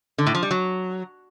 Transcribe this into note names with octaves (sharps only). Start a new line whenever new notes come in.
D3
A2
F3
G3
F#3